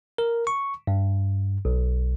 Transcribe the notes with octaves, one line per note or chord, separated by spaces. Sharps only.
A#4
C#6
G2
B1